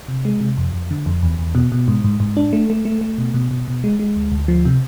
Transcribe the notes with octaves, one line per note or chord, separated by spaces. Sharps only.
C3
G#3
C3
F2
F2
D3
F2
E2
E2
B2
B2
G#2
G#2
G#2
D4
A3
A3
A3
A3
B2
B2
B2
B2
G#3
G#3
D2
D2
F3
C3